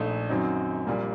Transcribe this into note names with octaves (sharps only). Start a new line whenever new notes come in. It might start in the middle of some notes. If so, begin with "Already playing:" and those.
Already playing: A#1 A#2 A3 D#4
F#2 D#3 F#3 C4 D#4
A#1 A#2 G3 A#3